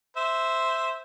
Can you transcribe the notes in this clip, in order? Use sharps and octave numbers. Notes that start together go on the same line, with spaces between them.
C5 E5